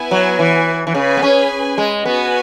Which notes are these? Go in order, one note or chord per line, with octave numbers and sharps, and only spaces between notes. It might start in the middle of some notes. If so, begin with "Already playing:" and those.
Already playing: B3 E4 B4 G#5
F#3
E3
E3
C#3 G#4 B4 G#5
B3
C#4
G#3
B3 F#4 B4 G#5